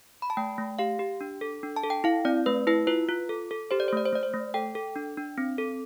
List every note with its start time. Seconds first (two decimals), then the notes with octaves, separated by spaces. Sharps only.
0.22 B5
0.30 A5
0.37 A3 G5
0.58 A3
0.79 G4 F5
0.99 G4
1.21 D4
1.41 A4
1.63 D4
1.76 A5
1.83 A4
1.90 G5
2.04 E4 F5
2.25 C4 D5
2.46 A3 B4
2.67 E4 B4
2.87 F4 B4
3.09 F4
3.29 A4
3.51 A4
3.71 G4 C5
3.80 D5
3.88 C5
3.93 A3 D5
4.05 C5
4.13 A3 D5
4.23 C5
4.33 A3
4.54 A4 G5
4.75 A4
4.96 D4
5.17 D4
5.38 C4
5.58 A4